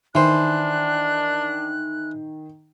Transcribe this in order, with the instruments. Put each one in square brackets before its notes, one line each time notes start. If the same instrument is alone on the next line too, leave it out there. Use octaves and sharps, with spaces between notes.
[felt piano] D#3 [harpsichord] E3 C5 [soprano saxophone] D4 [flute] F#6